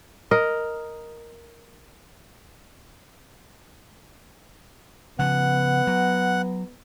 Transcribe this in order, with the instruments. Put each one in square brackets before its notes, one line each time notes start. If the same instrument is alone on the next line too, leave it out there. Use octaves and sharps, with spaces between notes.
[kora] A#4 D#5
[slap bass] C#3 F3 [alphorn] B3 [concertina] F#5
[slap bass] F#3